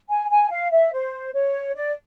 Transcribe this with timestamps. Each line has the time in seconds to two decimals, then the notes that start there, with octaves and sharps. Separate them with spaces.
0.10 G#5
0.30 G#5
0.51 F5
0.72 E5
0.93 C5
1.34 C#5
1.76 D5